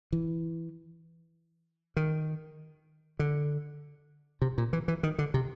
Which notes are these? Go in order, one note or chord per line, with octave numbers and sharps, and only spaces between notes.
E3
D#3
D3
C3
A#2
E3
E3
D#3
D3
C3